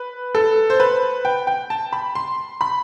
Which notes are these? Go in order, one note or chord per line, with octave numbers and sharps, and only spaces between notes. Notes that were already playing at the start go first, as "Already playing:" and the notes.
Already playing: B4
A4
C5
B4
G5
G5
A5
B5
C6
B5